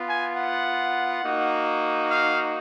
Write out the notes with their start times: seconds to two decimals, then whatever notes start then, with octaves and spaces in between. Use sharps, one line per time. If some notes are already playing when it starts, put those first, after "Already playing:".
Already playing: B3 F4
0.09 G#5
0.37 F#5
1.23 A#3 D#4 F#4
2.09 F5